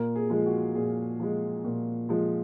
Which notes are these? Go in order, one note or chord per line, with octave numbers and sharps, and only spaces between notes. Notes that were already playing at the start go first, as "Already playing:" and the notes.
Already playing: A#2 A#4
G#4
F3 G#3
F#4
A#2 G#4
F3 G#3
A#2
F3 G#3